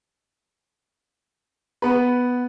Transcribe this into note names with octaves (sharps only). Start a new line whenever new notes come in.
B3 B4